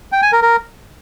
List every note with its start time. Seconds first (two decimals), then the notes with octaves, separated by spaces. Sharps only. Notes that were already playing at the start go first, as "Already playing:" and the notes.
0.12 G5
0.22 G#5
0.32 A#4
0.42 A#4